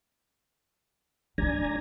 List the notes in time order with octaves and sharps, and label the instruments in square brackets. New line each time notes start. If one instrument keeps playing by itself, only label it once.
[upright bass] F#3 C#4 [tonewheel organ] D4 G#5 A#5